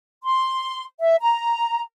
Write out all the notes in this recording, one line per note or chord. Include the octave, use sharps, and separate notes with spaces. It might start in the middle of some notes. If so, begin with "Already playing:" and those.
C6
E5
A#5